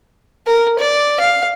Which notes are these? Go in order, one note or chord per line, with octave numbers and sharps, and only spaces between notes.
A#4
D5
F5